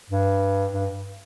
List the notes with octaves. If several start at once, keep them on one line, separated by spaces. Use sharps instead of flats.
G2
G2